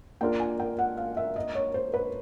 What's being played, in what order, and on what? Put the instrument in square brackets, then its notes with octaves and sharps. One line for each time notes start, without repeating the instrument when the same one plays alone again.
[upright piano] A#3 D4 F4 A#4 [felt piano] G5
[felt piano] G#5
G5
F#5
F5
E5
D#5
C#5
C5
B4